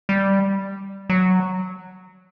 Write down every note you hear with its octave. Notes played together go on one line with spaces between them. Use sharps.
G3
F#3